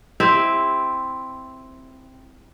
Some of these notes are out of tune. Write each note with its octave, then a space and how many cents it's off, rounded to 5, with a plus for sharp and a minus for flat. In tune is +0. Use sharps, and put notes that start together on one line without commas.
C4 +0 E4 +0 G4 +30